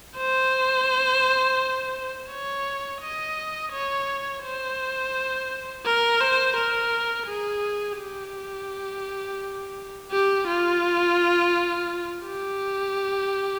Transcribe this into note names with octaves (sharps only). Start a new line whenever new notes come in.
C5
C#5
D#5
C#5
C5
A#4
C5
A#4
G#4
G4
G4
F4
G4